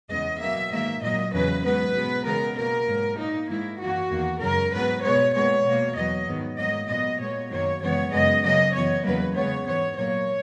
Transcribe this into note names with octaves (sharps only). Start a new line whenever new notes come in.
E2 C#3 G#3 B3 D#5
B2 F#3 A#3 E5
G#2 D#3 A#3 E5
A#2 F#3 A#3 D#5
E2 C#3 F#3 B4
G#2 F#3 B3 B4
B2 G#3 B3
C#3 E3 G#3 B3 A#4
B2 A#3 A#4
G#2 F#3 A#3
A#2 A#3 D#4
G#2 D#3 A#3 E4
F#2 E3 A#3 F#4
E2 D#3 A#3
F#2 C#3 G#3 A#4
G#2 F#3 B3 B4
B2 G#3 B3 C#5
A#2 G#3 B3 C#5
B2
A#3
E2 B2 F#3 B3 D#5
G#2 D#3 F#3 B3
G#2 F#3 A#3 D#5
A#2 F#3 B3 D#5
A#2 G#3 B3 C#5
F#2 D#3 F#3 A#3 C#5
F#2 C#3 E3 G#3 B3 C#5
F#2 C#3 G#3 B3 D#5
C#3 F#3 A#3 D#5
F#2 E3 B3 C#5
E2 C#3 F#3 A#3 B4
C#3 G#3 B3 C#5
G#2 E3 B3 C#5
A#2 F#3 A#3 C#5